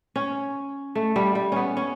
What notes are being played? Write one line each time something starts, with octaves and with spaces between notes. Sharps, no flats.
C#4
A3
G3
G3
B3 C#4
C#4